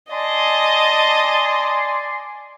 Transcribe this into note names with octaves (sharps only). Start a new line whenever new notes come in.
D5 D#5 G#5 A5 C6